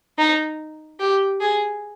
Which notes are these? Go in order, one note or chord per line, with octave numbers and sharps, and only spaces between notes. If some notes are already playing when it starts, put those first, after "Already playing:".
D#4
G4
G#4